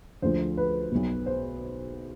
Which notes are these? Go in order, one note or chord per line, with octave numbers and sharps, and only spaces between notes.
D2 D3 F3 C5
B4
B1 B2
C5